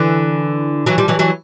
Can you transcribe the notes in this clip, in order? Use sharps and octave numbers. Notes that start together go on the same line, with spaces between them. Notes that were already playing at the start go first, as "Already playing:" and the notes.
Already playing: D3 E3
E3 F#3
F3 G3
E3 F#3
E3 F#3